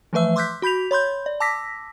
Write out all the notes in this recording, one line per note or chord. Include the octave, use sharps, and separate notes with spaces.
E3 F3 A3 B4 E5 E6
C6 D6 E6 F#6 G6 B6
F#4 B5 G6 B6 F7
C#5 B5 C6 G6
D5
A5 D6 E6 A#6 B6